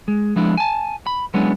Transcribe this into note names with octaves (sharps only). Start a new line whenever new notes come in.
G#3
F3 G#3 B3 D4 E4
G#5 A5
B5
F#3 G#3 B3 C#4 D4 E4